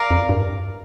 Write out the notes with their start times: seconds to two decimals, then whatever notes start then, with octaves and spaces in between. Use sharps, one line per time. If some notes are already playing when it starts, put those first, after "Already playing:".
Already playing: A#4 D5 F5 A#5
0.11 F2
0.29 G2